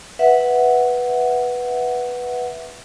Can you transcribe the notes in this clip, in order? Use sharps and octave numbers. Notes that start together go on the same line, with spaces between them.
B4 E5 F#5